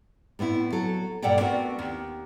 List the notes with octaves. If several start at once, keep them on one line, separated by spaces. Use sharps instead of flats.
A2 B3 C4 E4
F#3 A4
G2 A#2 A4 D5 F#5 G5
A3 B3 C4 D4 F#4 A#4
D#2